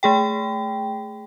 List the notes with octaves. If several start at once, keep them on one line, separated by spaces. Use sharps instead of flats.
A3 G#4 G5